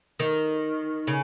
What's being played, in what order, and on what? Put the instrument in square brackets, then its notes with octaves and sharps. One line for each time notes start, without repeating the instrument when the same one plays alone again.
[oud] D#3
C#3